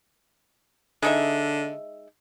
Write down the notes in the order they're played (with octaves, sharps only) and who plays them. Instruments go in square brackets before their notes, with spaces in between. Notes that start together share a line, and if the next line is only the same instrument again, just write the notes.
[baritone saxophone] D3 [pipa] G#3 D#4 E5